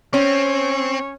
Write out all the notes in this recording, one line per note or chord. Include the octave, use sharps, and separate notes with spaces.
C4 C#4 C#5